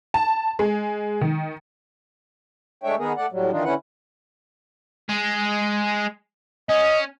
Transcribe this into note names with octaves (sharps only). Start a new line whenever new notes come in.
A5
G#3
D#3
G#3 A3 D4 C#5 E5 G5
D#3 B3 G#4 A#4
A3 D5 F#5
A2 F#3 G3
D#3 E3 D4 D#4 F4
D3 C#4 E4 B4 F#5
G#3 G#4
C#4 D#5